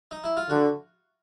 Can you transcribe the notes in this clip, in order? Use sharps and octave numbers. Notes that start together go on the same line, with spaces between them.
D#4
E4
F4
D3 F#4